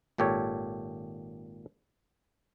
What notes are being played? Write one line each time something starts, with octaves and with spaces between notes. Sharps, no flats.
G#1 A#2 G4 A4 C#5